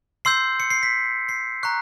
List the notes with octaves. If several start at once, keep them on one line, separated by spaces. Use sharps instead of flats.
C6 E6 G6 C7
C#7
C7
B6
C7
A#5 C#6 F#6